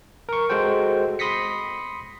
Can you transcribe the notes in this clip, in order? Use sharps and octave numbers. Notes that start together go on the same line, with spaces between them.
A#4 C#6
G#3 F#4 A4 C5 G5
B5 C6 D#6 A#6 B6 C#7